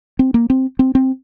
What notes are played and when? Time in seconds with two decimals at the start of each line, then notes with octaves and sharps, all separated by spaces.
0.19 C4
0.34 A#3
0.50 C4
0.79 C4
0.95 C4